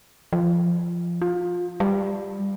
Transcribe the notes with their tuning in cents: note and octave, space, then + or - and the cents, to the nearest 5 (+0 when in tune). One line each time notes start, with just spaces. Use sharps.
F3 -15
F4 +20
G3 +10